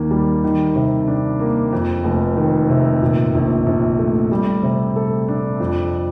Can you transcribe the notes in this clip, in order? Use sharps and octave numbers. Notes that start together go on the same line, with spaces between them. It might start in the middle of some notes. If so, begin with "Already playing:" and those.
Already playing: D#2 D#3 A#3
G3
D#3
C3
D4
A#3
F2
F1
D#3
C3
A#2
A#1
A#1
A3
G3
C3
A4
D4
F2